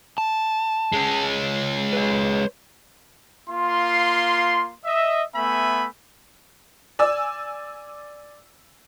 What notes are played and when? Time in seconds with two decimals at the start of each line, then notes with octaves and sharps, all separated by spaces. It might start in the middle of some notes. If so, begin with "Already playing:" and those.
0.18 A5
0.92 G#3 C#4
1.93 B4 C#5
3.49 A#3 F4 C6
4.85 D#5 E5
5.35 A3 B3 E5 G#5 B5
6.99 D5 G#5 E6